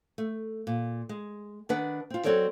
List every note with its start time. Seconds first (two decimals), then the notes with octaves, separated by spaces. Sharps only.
0.18 A3
0.67 A#2
1.09 G#3
1.69 D#3 D4 B4 F#5
2.10 C4 F4
2.24 F#3 C4 A4 C#5 D5